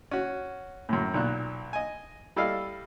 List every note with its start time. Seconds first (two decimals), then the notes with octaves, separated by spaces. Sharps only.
0.11 C#4 F#4
0.89 F#2 A2
1.14 B1 A#2 F#6
1.73 D#5 G#5
2.36 G3 E4 A4 D#5 F5